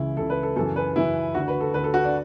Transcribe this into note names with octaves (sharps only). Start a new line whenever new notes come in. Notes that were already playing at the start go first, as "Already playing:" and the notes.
Already playing: C#2 C#3 E3 E4
C#2 C#3 E3 A4
B4
A4
F#2 C#3 E3 A4
B4
F#2 C#3 E3 E4
D2 D3 F#4
B4
A4
D2 D3 B4
A4
F#4
D4